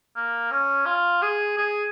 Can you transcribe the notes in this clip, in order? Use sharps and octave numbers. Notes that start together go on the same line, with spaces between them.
A#3
C#4
F4
G#4
G#4